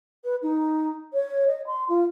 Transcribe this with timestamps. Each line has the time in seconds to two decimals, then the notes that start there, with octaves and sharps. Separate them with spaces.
0.24 B4
0.42 D#4
1.13 C#5
1.47 D#5
1.67 C6
1.89 F4